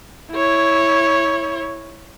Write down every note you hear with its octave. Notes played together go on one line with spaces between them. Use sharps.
E4 C#5